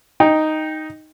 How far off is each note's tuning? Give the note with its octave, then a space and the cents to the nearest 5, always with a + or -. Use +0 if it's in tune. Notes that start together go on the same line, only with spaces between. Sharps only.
D#4 +0 G5 +10